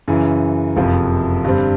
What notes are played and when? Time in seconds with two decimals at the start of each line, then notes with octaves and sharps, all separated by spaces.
0.08 F#2 C#3 E3
0.76 F#1 F2 C3 F3
1.44 G2 D3 G3 C4